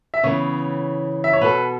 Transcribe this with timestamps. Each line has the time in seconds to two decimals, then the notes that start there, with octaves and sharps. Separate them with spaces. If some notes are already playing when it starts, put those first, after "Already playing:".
0.14 E5
0.23 C#3 E3 B3 C#5
1.24 E5
1.33 C#5
1.41 B2 B3 A4 B4